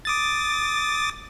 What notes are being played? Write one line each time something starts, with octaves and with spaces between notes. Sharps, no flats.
D6 D#6 A6